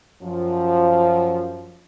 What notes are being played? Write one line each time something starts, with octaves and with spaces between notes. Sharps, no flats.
F#2 F3